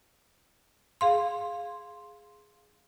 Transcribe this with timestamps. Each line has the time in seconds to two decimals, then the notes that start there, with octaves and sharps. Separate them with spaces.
1.01 G#4 F5 C6